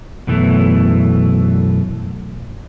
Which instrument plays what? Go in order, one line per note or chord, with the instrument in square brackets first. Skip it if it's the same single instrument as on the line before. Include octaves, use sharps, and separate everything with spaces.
[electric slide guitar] F#2 B2 E3 A3